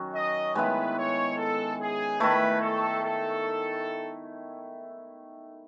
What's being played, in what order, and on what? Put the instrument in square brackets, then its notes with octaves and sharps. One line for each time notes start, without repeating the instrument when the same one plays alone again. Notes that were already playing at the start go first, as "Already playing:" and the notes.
Already playing: [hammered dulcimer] D#3 F#3 C#4
[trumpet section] D#5
[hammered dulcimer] D#3 G#3 B3 E4 [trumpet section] B4
[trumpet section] C#5
A4
G#4
[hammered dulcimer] D#3 A3 E4 [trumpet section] B4
[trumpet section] A4
A4